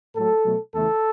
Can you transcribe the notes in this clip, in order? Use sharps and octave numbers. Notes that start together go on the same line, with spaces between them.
A2 F#3 A3 A4
B2 F#3 A3
E2 C#3 E3 A3 A4